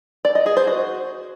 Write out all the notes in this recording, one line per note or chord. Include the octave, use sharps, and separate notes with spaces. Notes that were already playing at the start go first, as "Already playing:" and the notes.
D5
D#5
G#4
C5
F#4